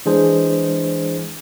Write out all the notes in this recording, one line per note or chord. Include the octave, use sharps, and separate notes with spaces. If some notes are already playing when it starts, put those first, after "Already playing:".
E3 G#3 D4 G#4 C5